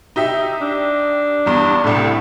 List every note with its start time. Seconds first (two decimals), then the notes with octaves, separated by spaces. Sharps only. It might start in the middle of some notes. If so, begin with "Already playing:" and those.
0.16 D#4 G4 E5
0.61 D4
1.46 E2 G2
1.84 C2 A2 A3